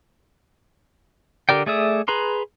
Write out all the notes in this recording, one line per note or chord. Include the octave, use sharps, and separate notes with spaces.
D3 G4 A#4 D5 G5
A3 G#4 D5 E5 D#6
G#4 B4 A#5 C6